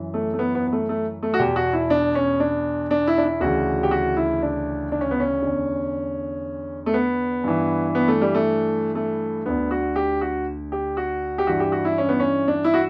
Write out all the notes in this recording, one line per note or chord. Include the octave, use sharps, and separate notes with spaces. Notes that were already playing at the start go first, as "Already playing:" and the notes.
Already playing: F#2 E3
A3
A3
B3
B3
B3
A3
A3
A3
F#4
E2 B2 G4
F#4
E4
D4
C#4
D4
D4
E4
D4
E4
D2 C#3 E3 F#4
G4
F#4
E4
D4
D4
C#4
B3
C#4
E2 D3
A3
B3
G2 E3
B3
A3
G3
A3
A3
D2 D3 B3
F#4
G4
F#4
G4
F#4
G4
G2 E3 F#4
G4
F#4
E4
C#4
B3
C#4
D4
E4
F#4